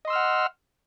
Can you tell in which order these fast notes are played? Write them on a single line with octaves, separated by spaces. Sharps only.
D#5 C6 E6 F6 F#5